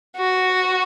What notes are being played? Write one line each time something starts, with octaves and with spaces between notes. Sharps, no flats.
F#4